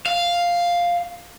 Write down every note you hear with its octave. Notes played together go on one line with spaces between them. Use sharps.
F5